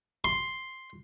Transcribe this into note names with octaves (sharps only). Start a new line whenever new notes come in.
C6